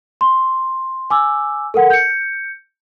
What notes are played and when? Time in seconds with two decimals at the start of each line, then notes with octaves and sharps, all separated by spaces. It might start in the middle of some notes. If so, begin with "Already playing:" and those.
0.21 C6
1.10 G#5 D6 E6
1.74 A4 A#4 F#5
1.90 G6 C#7